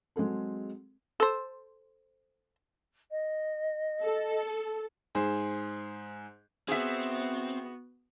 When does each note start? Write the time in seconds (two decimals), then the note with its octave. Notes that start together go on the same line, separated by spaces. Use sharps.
0.16 F#3 G#3 C4 G#4 A4
1.20 A4 C5
3.11 D#5
4.03 A4
5.15 G#2 G#4 C5
6.68 B3 C4 F#4 G#4 E5